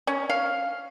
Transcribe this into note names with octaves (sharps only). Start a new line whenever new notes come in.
C#4
F5